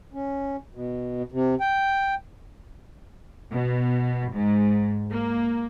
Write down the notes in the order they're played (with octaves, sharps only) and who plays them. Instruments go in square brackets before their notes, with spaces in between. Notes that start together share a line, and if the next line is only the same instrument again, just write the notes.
[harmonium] C#4
B2
C3
G5
[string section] B2
G#2
A#3